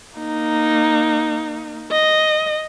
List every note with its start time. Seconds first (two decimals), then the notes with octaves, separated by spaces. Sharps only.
0.17 A#3 D#4
1.92 D#5